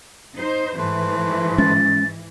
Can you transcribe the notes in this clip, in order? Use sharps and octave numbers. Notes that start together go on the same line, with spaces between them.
D#4 C5
G#2 E3 A3 B4 C5
G#3 C#4 A6